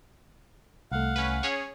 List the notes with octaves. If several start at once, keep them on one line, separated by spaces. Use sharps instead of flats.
C2 A3 F5 F#5
C#4 B4
C#4 G#4 C#5